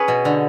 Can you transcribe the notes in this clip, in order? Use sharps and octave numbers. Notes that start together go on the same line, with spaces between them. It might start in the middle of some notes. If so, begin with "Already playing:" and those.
Already playing: C#4 G#4 B4 C#5
B2
D3